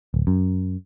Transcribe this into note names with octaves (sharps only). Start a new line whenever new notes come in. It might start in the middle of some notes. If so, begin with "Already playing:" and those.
D1
F#2